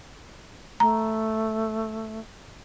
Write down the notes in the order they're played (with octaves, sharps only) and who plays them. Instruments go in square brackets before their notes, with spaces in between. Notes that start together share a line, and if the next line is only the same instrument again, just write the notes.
[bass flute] A3 [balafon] A#5